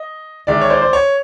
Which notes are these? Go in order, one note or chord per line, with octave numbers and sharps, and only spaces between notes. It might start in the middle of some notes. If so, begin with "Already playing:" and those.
Already playing: D#5
D#3 G#3 D5 E5
C#5
C5 D5
C5
C#5